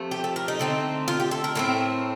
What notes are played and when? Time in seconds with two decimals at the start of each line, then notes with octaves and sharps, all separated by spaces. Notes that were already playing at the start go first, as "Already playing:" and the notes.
Already playing: C3 F3 A3
0.11 G4
0.24 A4
0.36 A#4
0.48 D#4
0.59 D3 A3 C4
1.08 F4
1.20 G4
1.31 A4
1.44 A#4
1.55 A2 A3 C4 A#4